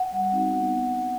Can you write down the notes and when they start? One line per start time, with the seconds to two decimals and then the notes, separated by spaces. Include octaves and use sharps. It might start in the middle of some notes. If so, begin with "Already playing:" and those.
Already playing: F#5
0.12 G3
0.32 C4 D#4 F#4
0.51 B3